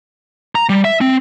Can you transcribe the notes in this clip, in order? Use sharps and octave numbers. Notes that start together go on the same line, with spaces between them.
A#5
G3
E5
C4